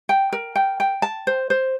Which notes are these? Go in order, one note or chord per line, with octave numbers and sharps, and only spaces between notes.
G5
A#4
G5
G5
A5
C5
C5